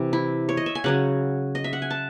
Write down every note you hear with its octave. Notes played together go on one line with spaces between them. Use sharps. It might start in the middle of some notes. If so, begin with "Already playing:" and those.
Already playing: C3 E3 C4
E4
C#5
D#5
E5
G#5
C#3 F#3 C#4 F#5
D#5
E5
F#5
G#5
A5